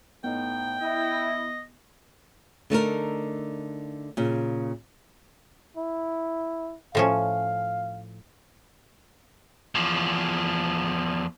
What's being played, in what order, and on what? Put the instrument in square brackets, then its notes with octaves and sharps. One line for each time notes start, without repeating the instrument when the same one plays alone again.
[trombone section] A2 D#4 [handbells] B3 [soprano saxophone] G5
[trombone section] E4 [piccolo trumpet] D#5
[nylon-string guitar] D3 A3 D#4 A#4
A#2 C#3
[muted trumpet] E4
[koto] A2 F3 C#4 [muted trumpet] F5
[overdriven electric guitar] E2 F3